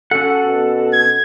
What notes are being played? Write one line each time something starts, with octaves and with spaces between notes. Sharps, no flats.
C#4 F#4 A4 F#5
B2
G#6